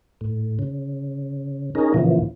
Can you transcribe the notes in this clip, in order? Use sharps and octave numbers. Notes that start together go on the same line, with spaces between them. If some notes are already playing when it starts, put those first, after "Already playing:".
A2
C#3
C#4 D#4 G#4 A#4
A#2 C#3 E3 F3